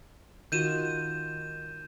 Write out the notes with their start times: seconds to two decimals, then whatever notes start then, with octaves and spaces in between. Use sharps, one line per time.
0.52 D#3 F4 F#4 G6 D#7 E7